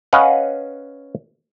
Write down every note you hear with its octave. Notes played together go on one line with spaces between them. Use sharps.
C#4 B4 D#5 F5 F#5